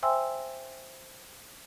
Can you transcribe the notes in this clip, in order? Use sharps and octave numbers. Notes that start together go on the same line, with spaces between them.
C5 E5 G5 G#5 C6 E6